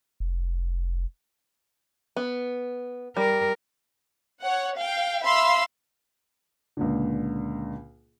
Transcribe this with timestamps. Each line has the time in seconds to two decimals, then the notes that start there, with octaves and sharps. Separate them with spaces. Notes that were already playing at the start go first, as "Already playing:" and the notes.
0.20 F1
2.16 B3
3.17 G3 A#4
4.39 C#5 F#5
4.75 F5 G5
5.22 E5 F5 B5 C6 E6
6.77 C#2 A#2 D3